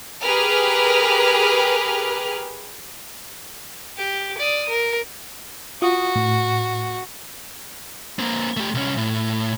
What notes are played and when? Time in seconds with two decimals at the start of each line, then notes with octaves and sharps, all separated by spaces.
0.23 G4 G#4 A#4 B4 F6
3.97 G4
4.38 D5 D#6
4.69 A#4
5.82 F4 F#4 D#6
6.15 A2
8.19 A#3 C4
8.57 A3 G4
8.74 C2 C#4
8.97 A2